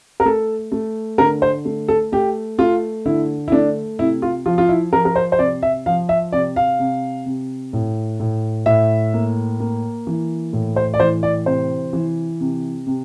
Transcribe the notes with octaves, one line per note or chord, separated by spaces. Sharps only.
A#4
A3 A4
A3
D3 A#4
C5
A3
A4
A3 G4
A3 F4
D3 E4
E4
A3 D4
C3 E4
F4
F3 F4
F4
E4
F3 A#4
A#4
C5
C5
C3 D5
E5
F3 F5
E5
C3 D5
F5
C3
C3
A2
A2
A2 E5
A#3
A#3
E3
A2
C5
D5
E3 C5
D5
C3 C5
E3
C3
C3